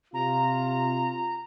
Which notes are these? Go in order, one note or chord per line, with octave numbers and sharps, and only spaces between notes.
C3 F4 A#5